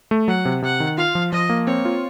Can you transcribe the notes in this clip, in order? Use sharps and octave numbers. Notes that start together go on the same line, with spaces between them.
A3
F#3 F#5
C3
C3 F#5
D#3
F4 F5
F3
F3 D#5
A#3
C4 C#5
F4